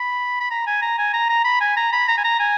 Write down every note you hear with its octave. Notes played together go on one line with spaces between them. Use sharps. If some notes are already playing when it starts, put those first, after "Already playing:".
Already playing: B5
B5
A#5
G#5
A#5
G#5
A#5
A#5
B5
G#5
A#5
B5
A#5
G#5
A#5
G#5